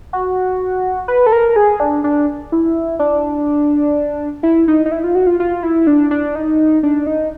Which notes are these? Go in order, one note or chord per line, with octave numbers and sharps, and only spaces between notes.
F#4
B4
A4
A#4
G#4
D4
D4
E4
D4
E4
D#4
D#4
E4
F4
F#4
F4
F4
E4
D4
D4
D#4
D4
D#4